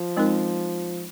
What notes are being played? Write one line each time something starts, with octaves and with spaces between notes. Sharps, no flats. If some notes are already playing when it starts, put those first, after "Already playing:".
Already playing: F3
G#3 C4 D#4 A#4